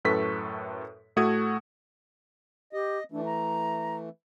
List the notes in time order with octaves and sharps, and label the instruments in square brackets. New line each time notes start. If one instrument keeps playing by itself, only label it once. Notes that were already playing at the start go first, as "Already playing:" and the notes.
[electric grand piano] F#2 A2 A4 B4 C#6 B6
A2 A3 F#4 D#6 G#6
[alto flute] G4 [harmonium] D#5
[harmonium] E3 A3 [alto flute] D4
[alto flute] A#5